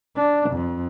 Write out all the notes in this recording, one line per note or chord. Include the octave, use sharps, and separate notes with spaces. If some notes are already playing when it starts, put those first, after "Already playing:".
D4
F2